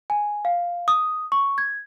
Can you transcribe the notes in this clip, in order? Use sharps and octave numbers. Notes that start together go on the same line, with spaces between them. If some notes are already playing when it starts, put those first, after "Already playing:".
G#5
F5
D#6
C#6
G#6